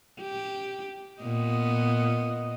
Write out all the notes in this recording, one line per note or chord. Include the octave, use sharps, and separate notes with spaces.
G4
A#2 B3 D#5